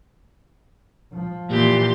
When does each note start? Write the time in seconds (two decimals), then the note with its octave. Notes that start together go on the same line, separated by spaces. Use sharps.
1.13 F3
1.50 A#2 E3 G4 C6